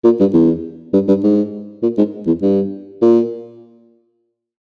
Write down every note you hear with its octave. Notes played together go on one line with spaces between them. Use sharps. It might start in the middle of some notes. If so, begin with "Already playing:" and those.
A#2
G2
E2
G2
G2
G#2
A#2
G#2
E2
G2
A#2